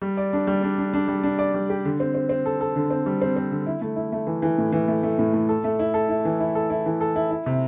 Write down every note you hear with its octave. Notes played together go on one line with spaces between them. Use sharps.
G3
D5
D4
G3
D4
D4
D4
G3
D4
D5
G3
G4
D3
C4
C4
C4
A4
A4
D3
C4
G3
C4
C4
D3
E4
A3
E4
A3
E3
E3
A2
E3
A3
A3
A2
A2
A4
A3
E4
A4
E4
E3
E4
A4
E4
E3
A4
E4
E4
C3